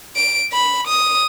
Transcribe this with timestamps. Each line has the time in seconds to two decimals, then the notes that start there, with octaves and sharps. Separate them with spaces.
0.16 D7
0.53 B5
0.87 D#6